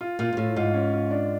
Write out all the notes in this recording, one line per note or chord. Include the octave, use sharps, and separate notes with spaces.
F4
A#2 F4
A#2
A2 F4
G#2 F4
C#4
F4
D4